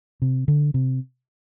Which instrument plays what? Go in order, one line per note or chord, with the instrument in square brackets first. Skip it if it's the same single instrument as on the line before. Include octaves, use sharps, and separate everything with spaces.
[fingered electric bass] C3
D3
C3